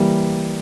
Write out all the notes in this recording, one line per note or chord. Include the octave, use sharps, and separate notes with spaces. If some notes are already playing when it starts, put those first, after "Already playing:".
Already playing: E3 G3 A#3